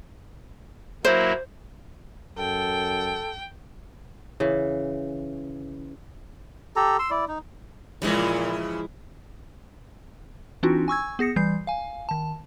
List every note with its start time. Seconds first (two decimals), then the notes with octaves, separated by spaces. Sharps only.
1.05 F#3 A#3 E4 C5
2.38 F#2 A4 G5
4.40 C#3 E3
6.76 G4 A4 A#5
6.99 C6 E6
7.10 E4 D5
7.28 D#4
8.02 A#2 C#3 E3 F3 G#3 E4
10.63 E3 C4 D4 D#4 F4 F#4
10.88 G#5 C#6 E6 G#6
11.19 B3 G#4 A#6 C#7
11.36 E3 G3 G6 C7
11.67 F5 G#5
12.09 D#3 A5